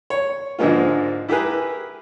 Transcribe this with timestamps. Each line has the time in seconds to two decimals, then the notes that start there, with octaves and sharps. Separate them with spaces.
0.10 C#5
0.59 G#2 D3 F3 G#3 A#3 F4
1.28 E4 G4 G#4 A#4 B4